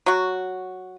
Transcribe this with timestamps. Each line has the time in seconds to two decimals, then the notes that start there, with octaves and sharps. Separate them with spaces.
0.06 F#3 F#4